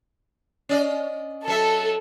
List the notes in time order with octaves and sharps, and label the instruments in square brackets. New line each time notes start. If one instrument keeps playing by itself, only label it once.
[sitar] C#4 D5 D#5
[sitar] F#3 E5 [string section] A4